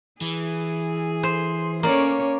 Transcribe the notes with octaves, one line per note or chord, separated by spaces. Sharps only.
E3 G#4
C5
A#3 C#4 C#5 D5